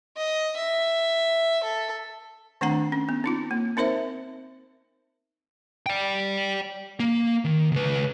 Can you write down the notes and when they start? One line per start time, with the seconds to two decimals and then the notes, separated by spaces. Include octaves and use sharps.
0.17 D#5
0.57 E5
1.63 A4
2.61 D#3 A3 C4 D4 F#5 A#5
2.92 C#4
3.09 B3
3.24 C4 D#4 F4
3.51 A#3
3.77 C4 D#4 A#4 C5 E5
5.86 D5 G5
7.00 A#3
7.45 D#3
7.72 C#2 B4